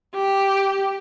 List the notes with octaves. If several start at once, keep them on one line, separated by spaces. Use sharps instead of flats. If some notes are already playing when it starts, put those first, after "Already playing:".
G4